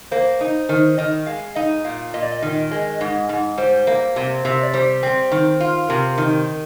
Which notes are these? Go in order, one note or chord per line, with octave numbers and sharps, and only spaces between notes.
A#3 C5
D#4
D#3 C5
D#3 D#5
G#3 F5
D#4 D#5
A#2 F5
A#2 D#5
D5
D#5
D#3 D#5
G#3 D#5
G#2 D#5
G#2
G3 C5
A#3
C3
C3
D5
G3 C5
C4
D#3
F4
C3 A#4
D#3